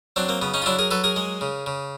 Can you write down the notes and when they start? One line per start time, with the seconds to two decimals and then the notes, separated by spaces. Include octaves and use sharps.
0.16 F#3 C4 D4
0.29 A#3 C4
0.42 C#3 B3
0.54 C#4 D#4
0.62 F4
0.66 F#3 D4 E4
0.79 G#4 A#4
0.91 F#3 A4 B4
1.04 G#4 A#4
1.16 G#3
1.41 C#3
1.66 C#3